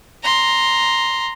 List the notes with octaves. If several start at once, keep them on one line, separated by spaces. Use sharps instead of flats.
A#5 C6